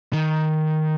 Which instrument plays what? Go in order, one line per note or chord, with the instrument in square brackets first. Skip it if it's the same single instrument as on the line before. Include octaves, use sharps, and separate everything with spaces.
[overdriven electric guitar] D#3